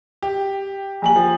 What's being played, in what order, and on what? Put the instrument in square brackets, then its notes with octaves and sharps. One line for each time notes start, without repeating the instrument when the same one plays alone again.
[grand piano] G4
[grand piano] A#1 G4 F#7 [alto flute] G#5
[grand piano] F3